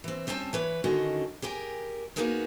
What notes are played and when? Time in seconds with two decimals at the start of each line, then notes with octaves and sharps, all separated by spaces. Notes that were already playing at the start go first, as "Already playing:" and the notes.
0.04 E3 C4
0.27 G3 C4 C#4 C#5 G5 A5
0.53 E3 B4 C#5
0.84 D3 D#3 C#4 F#4 D#5
1.42 G4 G#4 A#4 G5
2.16 A#3 B3 D#4 F#4 G#4 A#4